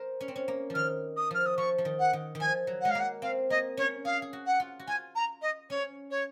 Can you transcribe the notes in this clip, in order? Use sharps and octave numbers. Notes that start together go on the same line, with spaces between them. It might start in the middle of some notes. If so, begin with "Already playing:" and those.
Already playing: A#4 C5
C#4
C4
C#4
A#3
F3
D#3 F6
D#6
F3 F6
D#6
F3 C#6
F3
D#3
F#5
D#3
D#3
F3 G#5
F#3
G#3 F#5
F5
A#3 F#5
C4 F5
A#3 D#5
C#4 C#5
G#4 F5
G#4
F#4
F#5
F4
F#4
F4 G#5
A#5
D#5
C#4 C#5
C#5